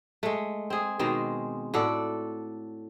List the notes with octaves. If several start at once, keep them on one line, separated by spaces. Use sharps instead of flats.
G#3 A3
C4 G#4
B2 D#3 G#3 C4
A2 F#4 A4 D5